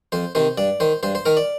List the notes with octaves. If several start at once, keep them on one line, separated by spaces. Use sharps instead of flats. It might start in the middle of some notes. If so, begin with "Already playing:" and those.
F2 C5
C3 D#3 C5
G2 D5
D#3 C5
G2 C5
C5
D#3 A#4
D5